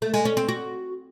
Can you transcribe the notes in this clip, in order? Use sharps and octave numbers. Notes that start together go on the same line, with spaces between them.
A3
G#3
C#4
C4
F#4